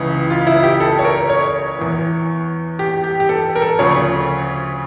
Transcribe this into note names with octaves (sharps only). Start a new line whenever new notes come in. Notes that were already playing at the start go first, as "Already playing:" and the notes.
Already playing: C#2 C#3 E3
F4
E4
G4
A4
C#5
A#4
C#5
E2 E3
G4
G4
G4
A4
A#4
A4
D2 C#3 F3 C#5